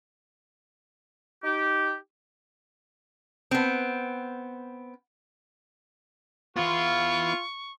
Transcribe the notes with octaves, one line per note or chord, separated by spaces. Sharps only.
D#4 G4
B3 C4
B3 E4 F4 C#6